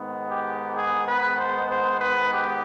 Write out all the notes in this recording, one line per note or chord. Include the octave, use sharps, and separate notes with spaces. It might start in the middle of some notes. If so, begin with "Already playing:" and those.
Already playing: G#2 D#3 G#3 B3
G4
G#4
B4
C5
C5
B4
G4